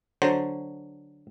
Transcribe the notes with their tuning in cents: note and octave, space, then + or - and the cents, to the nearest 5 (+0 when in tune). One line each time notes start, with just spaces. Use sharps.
D3 +0 F#3 +0 C5 +0